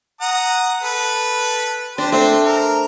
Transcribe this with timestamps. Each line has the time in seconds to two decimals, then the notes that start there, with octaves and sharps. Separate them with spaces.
0.21 F#5 A#5 D#6
0.83 A4 B4
1.98 D4 G4 C5
2.12 A3 C4 C5
2.45 A#4